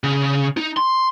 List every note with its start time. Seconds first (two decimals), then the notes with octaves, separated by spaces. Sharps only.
0.04 C#3
0.57 D#4
0.77 C6